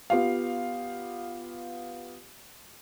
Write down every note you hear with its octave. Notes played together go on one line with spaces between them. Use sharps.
B3 F4 G4 F5